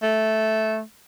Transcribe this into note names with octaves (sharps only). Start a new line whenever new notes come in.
A3